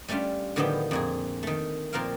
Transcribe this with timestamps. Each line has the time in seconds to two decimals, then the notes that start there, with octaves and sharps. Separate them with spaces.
0.08 G3 A3 C#4 D4 F4
0.56 A2 D3 D#3 F3 B3 G4
0.91 F2 A#2 G#4
1.43 D#3 A3
1.93 A#2 F3 C4 A#4 F5